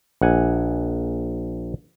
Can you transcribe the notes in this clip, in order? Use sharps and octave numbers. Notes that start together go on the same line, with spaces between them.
A#1 F#5 G#5